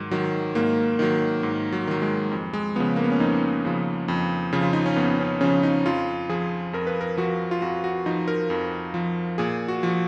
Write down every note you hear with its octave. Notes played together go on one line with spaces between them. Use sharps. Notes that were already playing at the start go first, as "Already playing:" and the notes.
Already playing: G#2 D#3 F#3
D#3 F#3
G#2 A#3
D#3 F#3
G#2
F#3
D#3 F#3
G#3
F2
G#3
C#3 F3 B3
A#3
B3
C#4
F2 D#4
C#3 F3
F2
C#3 F3
F4
D#4
C#4
F2 B3
C#4
C#3 F3 C#4
D#4
F2 F4
F3 G#4
F2 A#4
B4
A#4
F3 F#4
F4
F2 F#4
F#4
F3 D#4
A#4
F2
F3
A#2 G#4
F#4
F3 F#4